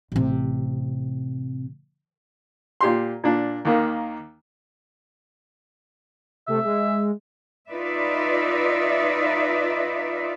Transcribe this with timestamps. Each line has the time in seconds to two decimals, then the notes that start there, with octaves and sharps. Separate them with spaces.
0.12 A1 C3
2.81 A#2 G4 C6
3.24 A#2 D4
3.65 D#2 D#3 A#3
6.48 C3 A3 E5
6.64 G#3
7.69 D#4 F4 B4 D5 E5